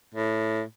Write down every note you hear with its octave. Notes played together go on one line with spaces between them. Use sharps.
A2